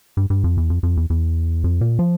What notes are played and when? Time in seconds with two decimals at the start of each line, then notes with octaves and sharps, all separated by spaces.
0.17 G2
0.30 G2
0.44 F2
0.57 E2
0.70 F2
0.83 F2
0.97 E2
1.10 E2
1.64 F2
1.81 A#2
1.99 F3